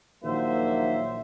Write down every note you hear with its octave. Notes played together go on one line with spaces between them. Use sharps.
A#1 D#3 F#3 A#3 C5 E5